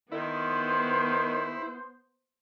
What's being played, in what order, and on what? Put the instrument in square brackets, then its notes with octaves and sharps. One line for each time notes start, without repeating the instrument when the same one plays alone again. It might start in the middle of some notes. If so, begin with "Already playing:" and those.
[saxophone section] D#3 [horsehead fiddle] B3 C5 [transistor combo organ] E4